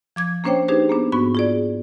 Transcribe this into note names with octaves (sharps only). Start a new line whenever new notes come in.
F3 D6 G#6
A#3 C#4 D4 C5 C#5 G5
D4 D#4 G4 G#4 B4 C5
A#3 B3 D4
G#2 B3 F#4 C#6
F4 G#4 D5